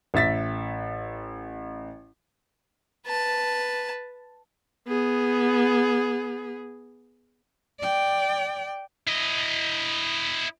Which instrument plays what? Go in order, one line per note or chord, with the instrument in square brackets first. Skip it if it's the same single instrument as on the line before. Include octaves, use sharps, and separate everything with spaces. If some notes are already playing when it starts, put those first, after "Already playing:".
[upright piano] A1 E5 A6 B6
[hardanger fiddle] B4 A5
[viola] B3 G#4
[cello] D5 G5
[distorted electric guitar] E4 D#5